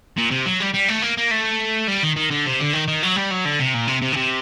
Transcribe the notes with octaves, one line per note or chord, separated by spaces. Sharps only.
A#2
C3
F#3
G3
G3
A3
A#3
A#3
A3
G3
D#3
D#3
D3
C3
D3
D#3
D#3
F#3
G3
F#3
D3
C3
A#2
C3
C3
D3
C3